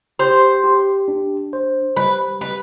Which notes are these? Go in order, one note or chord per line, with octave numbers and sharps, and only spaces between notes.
G4 C5
G4
D4
C5
G3 B4
G3 B4